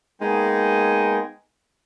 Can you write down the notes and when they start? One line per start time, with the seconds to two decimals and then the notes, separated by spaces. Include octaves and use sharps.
0.21 G#3 A#3 B3 D#4 G5 G#5